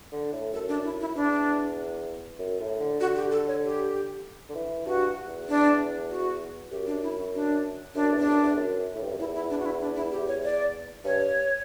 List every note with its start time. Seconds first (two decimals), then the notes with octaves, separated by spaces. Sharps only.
0.12 D3
0.32 A2
0.53 F#2 A4
0.68 D4
0.84 E4
1.00 E4
1.15 E2 D4
2.39 F#2
2.60 A2
2.80 D3
3.00 D3 F#4
3.15 G4
3.31 A4
3.47 C#5
3.63 G4
4.49 D3
4.55 E3
4.86 G2 F#4
5.27 E2
5.49 D4
6.10 F#4
6.71 F#2 G4
6.87 D4
7.02 E4
7.18 F#4
7.34 D4
7.95 F#2 D4
8.11 E2
8.19 D4
8.26 F#2
8.42 E2
8.57 F#2
8.95 A2
9.03 G2
9.11 F#2
9.19 E2 E4
9.34 E4
9.50 D4
9.59 F#4
9.66 E4
9.80 D4
9.96 E4
10.11 G4
10.28 C#5
10.43 D5
11.04 G2 C#5